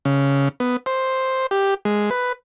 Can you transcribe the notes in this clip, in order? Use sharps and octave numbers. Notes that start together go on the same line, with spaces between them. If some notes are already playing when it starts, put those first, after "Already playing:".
C#3
B3
C5
G4
G#3
B4